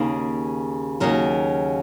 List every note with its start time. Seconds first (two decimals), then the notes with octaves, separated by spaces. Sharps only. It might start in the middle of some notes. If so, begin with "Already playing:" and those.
Already playing: D#2 C#3 A#3 G#4
1.00 D#2 C#3 F#3 A#4